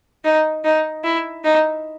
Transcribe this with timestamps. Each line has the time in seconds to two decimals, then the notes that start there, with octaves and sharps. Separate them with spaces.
0.25 D#4
0.65 D#4
1.04 E4
1.44 D#4